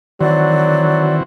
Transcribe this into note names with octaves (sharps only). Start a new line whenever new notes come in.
D#3 E3 F#3 C4 F#4 D5